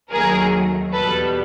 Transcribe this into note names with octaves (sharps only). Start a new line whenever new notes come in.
D#2 D#3 F#3 A3 G#4 A#4
E2 B2 G3 B3 A4 B4